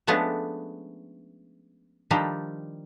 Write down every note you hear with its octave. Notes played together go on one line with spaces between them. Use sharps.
F3 G#3 A3 B3 C#4 D4
D#3 F3 G3 D4 D#4 G4